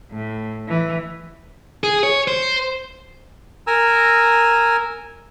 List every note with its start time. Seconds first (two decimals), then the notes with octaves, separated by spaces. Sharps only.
0.11 A2
0.68 E3
1.84 G#4
2.03 C#5
2.28 C5
3.67 A#4 G#5 A#5 E6